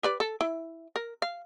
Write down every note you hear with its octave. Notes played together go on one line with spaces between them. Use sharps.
G4 B4 D5
A4
E4
A#4
F5